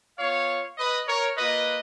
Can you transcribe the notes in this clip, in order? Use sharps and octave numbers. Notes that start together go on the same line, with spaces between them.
B3 F4 C#5 F5
B4 D#5
A#4 C#5
A#3 F4 B4 D#5